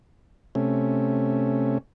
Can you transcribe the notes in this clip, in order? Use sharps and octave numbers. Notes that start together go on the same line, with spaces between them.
C3 A3 C#4